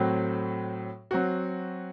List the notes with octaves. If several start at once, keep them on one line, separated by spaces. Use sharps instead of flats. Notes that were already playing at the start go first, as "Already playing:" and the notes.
Already playing: A2 F#3 C4 F#4
F#3 C4 F#4